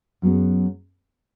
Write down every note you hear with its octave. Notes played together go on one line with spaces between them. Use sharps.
F#2 F#3 B3 G#4